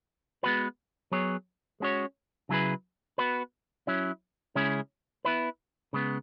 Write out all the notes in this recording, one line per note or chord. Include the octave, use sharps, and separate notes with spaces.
G#3 B3 F#4 B4
F#3 B3 G#4 C#5
G#3 C#4 F#4 C#5
C#3 F#3 E4 G#4 B4
B3 F#4 B4
F#3 C#4 E4
C#3 G#3 C#4 E4 G#4
B3 E4 B4
C#3 G#3 B3